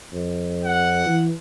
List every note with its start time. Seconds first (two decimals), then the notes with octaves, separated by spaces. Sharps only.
0.13 F2
0.64 F#5
1.06 E3